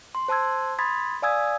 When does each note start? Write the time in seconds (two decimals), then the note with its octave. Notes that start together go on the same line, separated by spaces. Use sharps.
0.15 C6
0.28 C5 A5 C6 E6 G#6
0.79 B5 C6 D#6 G#6 A6 B6
1.22 D5 F5 G#5 D#6 E6 G#6